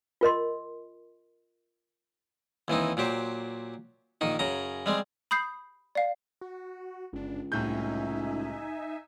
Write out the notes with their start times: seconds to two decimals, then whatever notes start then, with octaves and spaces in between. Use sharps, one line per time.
0.21 F4 A#4 D#5 C6
2.68 D#2 E3 C4 D#4
2.97 A#2 F#3 G4 C5
4.21 A#1 D#3 D#4
4.39 F#2 C#3 A#5
4.86 G3 G#3 C4
5.31 B5 D#6 G6 C7
5.95 D5 F5
6.41 F#4
7.13 G1 C#2 D4
7.52 C2 A2 D#4 E5 G#5 G6